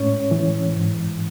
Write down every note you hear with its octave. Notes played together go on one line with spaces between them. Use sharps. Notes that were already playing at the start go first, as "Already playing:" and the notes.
Already playing: A2 G#3 C#4 C#5
E3
G#2